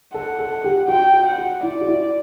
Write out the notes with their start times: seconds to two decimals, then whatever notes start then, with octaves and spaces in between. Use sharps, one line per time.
0.14 A4 F#5
0.39 A4
0.64 G4
0.88 F#4 G5
1.13 F#4
1.26 F#5
1.38 F#4
1.63 E4 D5
1.81 F#4
1.88 E4